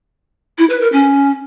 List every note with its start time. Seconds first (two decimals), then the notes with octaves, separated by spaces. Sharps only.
0.58 E4
0.70 B4
0.81 A#4
0.92 C#4